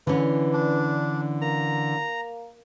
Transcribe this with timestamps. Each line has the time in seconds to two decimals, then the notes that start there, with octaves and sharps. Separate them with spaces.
0.07 D3 E3 C#4 B4
0.53 D4
1.42 A#3 A#5